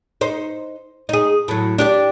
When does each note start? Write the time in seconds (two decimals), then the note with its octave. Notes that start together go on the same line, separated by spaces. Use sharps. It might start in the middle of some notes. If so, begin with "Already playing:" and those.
0.21 D#4 C5
1.09 D#4 G#4
1.48 A2 F#3
1.78 D4 G4 D5